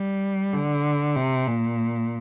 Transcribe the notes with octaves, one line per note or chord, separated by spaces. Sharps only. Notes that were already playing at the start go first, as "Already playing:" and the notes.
Already playing: G3
D3
C3
A#2